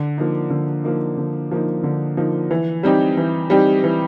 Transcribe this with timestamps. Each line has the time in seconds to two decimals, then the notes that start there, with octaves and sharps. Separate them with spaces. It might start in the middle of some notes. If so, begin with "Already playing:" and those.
Already playing: D3
0.18 F3 A#3 D#4
0.50 D3
0.84 F3 A#3 D#4
1.17 D3
1.51 F3 A#3 D#4
1.83 D3
2.17 F3 A#3 D#4
2.51 E3
2.83 G3 C4 D#4 G4
3.17 E3
3.50 G3 C4 D#4 G4
3.84 E3